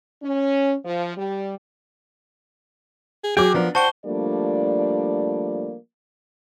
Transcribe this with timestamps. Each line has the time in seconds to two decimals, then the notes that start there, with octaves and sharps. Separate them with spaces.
0.23 C#4
0.84 F3
1.16 G3
3.24 G#4
3.37 F#3 G#4 G5 D6
3.54 F3 B3 D4 A#4
3.75 F#4 C5 F#5 G5 A5 C#6 G7
4.06 F3 G3 A3 A#3 D4 D5